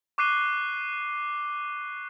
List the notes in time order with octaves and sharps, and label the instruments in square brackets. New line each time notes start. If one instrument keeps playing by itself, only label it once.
[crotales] C#6 D6 F#6 C7 D#7 G7